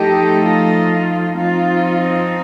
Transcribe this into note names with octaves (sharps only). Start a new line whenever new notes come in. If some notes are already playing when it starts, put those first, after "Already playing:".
Already playing: F3 A3 D#4 G4 A4 D#5
F4
F3 C4 D#4 F4